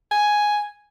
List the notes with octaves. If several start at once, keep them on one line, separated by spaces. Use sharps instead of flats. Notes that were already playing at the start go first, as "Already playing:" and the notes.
G#5